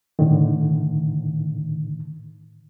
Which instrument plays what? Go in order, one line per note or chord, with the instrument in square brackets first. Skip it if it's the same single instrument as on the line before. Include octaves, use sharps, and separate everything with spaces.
[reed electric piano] A2 D3 D#3